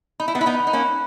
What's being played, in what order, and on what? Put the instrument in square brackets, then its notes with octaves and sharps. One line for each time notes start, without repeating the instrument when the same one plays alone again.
[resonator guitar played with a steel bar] D#4 [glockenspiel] B5
[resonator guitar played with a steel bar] E4
B3 D#4
[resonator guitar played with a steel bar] E4 [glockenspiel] F#6
[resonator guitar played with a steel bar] B3 D#4
[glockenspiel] B5
[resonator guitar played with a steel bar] D#4
A#3 C#4
[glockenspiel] F#6